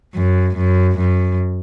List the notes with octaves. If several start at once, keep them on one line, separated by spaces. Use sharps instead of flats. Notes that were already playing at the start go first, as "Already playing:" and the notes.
F#2
F#2
F#2